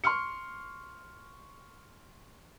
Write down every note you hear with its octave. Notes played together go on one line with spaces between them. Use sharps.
C6 C#6 F6 C#7